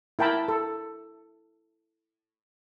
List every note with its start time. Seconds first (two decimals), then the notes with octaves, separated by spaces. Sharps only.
0.19 E4 A#4 G5 A5 B5
0.48 A4